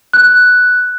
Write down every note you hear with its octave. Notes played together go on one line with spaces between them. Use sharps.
F#6